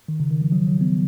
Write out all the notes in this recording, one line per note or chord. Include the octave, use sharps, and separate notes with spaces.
D#3
C#3
D#3
F3
F#3
F#3
B3